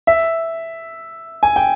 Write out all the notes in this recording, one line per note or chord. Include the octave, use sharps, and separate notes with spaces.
E5
G#5
G5